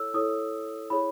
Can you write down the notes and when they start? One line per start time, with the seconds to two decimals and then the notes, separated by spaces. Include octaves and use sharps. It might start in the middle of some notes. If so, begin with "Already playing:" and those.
Already playing: E4 A4 C#5 E6
0.14 E4 A4 C#5 D#6
0.90 E4 G#4 C#5 B5